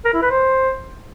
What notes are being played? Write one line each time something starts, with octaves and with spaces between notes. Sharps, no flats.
A#4
E4
B4
C5